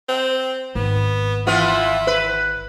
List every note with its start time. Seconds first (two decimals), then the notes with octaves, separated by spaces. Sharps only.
0.09 C4
0.75 G#1 B3
1.47 E3 B3 E4 F4
2.07 B4